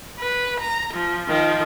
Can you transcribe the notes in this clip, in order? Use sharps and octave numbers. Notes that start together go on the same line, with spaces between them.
B4
A#5
F3
D#3 F3